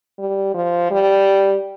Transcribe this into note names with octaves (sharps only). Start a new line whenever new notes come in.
G3
F3
G3